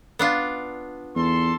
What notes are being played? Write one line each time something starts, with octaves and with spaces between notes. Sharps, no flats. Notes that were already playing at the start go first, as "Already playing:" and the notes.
B3 D4 F4
E2 A4 C6